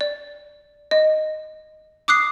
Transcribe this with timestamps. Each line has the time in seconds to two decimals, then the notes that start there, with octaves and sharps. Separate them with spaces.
0.01 D5
0.91 D#5
2.08 D6 D#6 F#6 C7